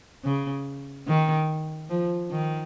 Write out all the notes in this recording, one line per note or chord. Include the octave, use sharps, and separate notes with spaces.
C#3
D#3
F3
D#3